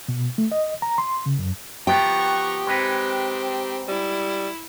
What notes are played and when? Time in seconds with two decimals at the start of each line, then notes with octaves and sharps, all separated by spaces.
0.09 B2
0.38 A3
0.52 D#5
0.82 A#5
0.98 C6
1.26 C#3
1.39 F#2
1.87 F3 B3 G4 G5 A#5 C#6
2.67 G#3 C4 D#4 B4
3.88 G3 E4